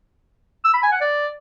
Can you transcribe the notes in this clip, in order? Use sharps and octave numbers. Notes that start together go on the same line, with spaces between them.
E6
B5
G#5
F#5
D5